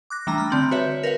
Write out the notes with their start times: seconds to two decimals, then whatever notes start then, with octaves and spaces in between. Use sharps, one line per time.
0.10 D6 F#6 A#6
0.27 E3 G3 A3 D4 A#5
0.38 B5 F6
0.50 D3 C4 F#7
0.71 F#4 B4 C#5 E5
1.03 A#4 B4 C#5 F5